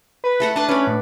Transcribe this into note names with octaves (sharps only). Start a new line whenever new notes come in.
B4
A3 A4 F#5
D4 B4 A5
C#4 B4 D5
A2